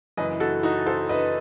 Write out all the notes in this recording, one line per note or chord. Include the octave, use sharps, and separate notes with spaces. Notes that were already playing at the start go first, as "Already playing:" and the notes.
F#1 F#2 E3 B4 D#5
F#4 A4
D#4 F#4
A4 C5
B4 D#5